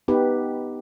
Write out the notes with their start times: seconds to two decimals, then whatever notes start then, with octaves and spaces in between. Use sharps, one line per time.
0.08 B3 D#4 G4 B4